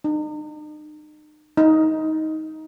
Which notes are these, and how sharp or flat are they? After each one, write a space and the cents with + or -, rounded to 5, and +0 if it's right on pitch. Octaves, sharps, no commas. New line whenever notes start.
D#4 -40
D#4 +15